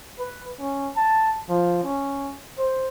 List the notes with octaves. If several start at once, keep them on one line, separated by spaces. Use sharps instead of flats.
B4
C#4
A5
F3
C#4
C5